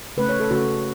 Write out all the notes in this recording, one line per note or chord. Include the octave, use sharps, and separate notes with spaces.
C#3 A3 C#4 B4
C#5
A4
C#3 A3 C#4 F#4